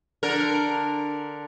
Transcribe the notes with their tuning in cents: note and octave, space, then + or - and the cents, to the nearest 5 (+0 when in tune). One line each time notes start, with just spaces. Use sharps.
D3 +0 A#4 +0